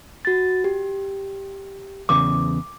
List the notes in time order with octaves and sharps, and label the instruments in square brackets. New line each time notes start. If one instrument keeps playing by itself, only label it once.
[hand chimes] F#4 A6
G4
[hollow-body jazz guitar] E2 C#3 [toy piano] D6